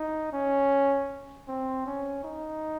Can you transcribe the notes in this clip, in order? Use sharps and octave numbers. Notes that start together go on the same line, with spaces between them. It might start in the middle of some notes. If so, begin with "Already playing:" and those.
Already playing: D#4
C#4
C4
C#4
D#4